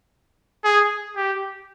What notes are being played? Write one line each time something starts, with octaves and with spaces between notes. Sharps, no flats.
G#4
G4